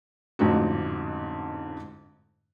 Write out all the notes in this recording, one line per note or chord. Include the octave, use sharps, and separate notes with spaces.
A1 F2 G#2 D3 F#4